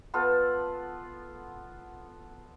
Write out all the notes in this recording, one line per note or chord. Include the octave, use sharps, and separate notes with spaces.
B3 F4 A4 B4